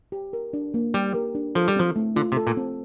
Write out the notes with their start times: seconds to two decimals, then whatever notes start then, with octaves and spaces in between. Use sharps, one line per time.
0.12 G4
0.33 A#4
0.53 D4
0.74 A#3
0.94 G3 G4
1.14 A#4
1.35 D4
1.55 F3 A4
1.68 G3
1.76 F3 C4
1.96 A3
2.16 D3 F4
2.32 C3
2.37 A4
2.47 A#2
2.57 C4